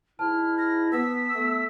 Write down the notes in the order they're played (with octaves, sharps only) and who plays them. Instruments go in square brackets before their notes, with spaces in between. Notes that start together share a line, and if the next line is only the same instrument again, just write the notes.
[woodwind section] G#2 E4 [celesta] A5 [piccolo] F6
[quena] F6 [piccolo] A#6
[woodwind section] B3 [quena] E6 [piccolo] B6
[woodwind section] A3 B3